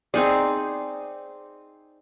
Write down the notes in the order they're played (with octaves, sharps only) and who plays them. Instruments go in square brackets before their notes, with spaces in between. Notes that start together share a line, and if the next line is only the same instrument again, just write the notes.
[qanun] C4 D#4 G#4 [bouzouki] D5